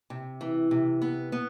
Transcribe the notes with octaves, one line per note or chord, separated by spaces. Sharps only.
C3
E3
C3
B3
B3